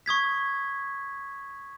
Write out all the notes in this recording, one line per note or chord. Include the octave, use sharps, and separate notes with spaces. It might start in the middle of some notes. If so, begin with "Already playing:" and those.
C#6 D#6 G#6 B6